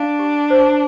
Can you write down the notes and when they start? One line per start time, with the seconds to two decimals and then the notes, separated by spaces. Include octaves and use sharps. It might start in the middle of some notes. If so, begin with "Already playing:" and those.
Already playing: D4 F5
0.19 G4
0.50 C5